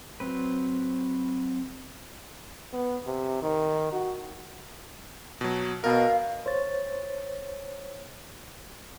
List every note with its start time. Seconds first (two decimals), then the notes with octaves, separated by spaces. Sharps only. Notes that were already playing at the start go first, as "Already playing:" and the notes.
0.20 F#3 C4 B4
2.73 B3
3.07 C3
3.42 D#3
3.93 F#4
5.41 B2 F#3
5.84 B2 A#4 F5
6.46 C5 C#5 A6